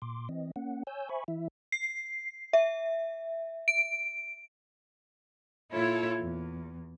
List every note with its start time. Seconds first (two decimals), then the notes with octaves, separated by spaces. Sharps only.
0.02 A#2 C6 D6
0.29 E3 C4 D#5
0.56 A#3 C#4 F#5
0.87 C#5 G#5 E6 G6
1.09 C5 E5 G#5 B5 C#6
1.28 E3 E4 E5
1.72 C7
2.53 E5
3.68 D7
5.72 A#2 E4 F4 A4 C#5
6.20 E2